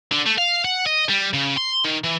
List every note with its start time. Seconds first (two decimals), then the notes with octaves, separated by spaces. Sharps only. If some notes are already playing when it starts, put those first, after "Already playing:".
0.12 D3
0.26 A3
0.38 F5
0.65 F#5
0.87 D#5
1.09 G3
1.33 C#3
1.57 C6
1.84 D#3
2.04 E3